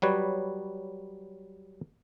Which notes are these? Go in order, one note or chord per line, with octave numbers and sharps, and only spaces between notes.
F#3 G3 B4 C#5